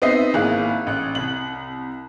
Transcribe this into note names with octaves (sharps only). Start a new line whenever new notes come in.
B3 C4 D#4 D#5 E5 C7
G#1 A#3 E4 G#4 F#6
A1 F#6
C2 F#7